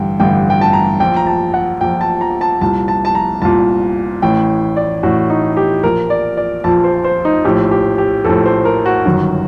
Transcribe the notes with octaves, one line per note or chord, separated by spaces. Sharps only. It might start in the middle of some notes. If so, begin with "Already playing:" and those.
Already playing: A1 G2 D3 G5
A1 G2 D3 G5
G5
A5
A#5
A#1 A#2 G5
A#5
A5
F#5
A#1 A#2 G5
A5
A#5
A5
C2 A#2 A5
A5
A5
A#5
C2 A#2 A5
A1 A2 G5
D5
A1 A2 F#4
D#4
G4
A#1 A#2 A#4
D5
D5
A#1 A#2 A5
C5
C5
D#4
A#1 A2 G4
G4
G4
A#1 A2 A4
C5
A#4
F#4
G1 F#2 D#3